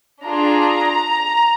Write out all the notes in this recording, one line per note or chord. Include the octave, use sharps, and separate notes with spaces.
D4 F4 G#4 A#5